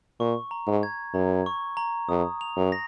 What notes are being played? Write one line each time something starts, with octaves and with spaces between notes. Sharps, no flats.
A#2 C#6
A#5
G#2
G#6
F#2 A#5
C#6
A#5
F2 D#6
F7
F#2
A#6